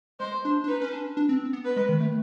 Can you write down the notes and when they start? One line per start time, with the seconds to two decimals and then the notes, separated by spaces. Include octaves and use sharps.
0.20 G#3 C5
0.45 D4
0.64 D4
0.68 D#4 B4
0.82 C#4
0.93 D4
1.17 D4
1.29 C4
1.53 B3
1.65 B4
1.76 G#3
1.89 D#3
2.01 A3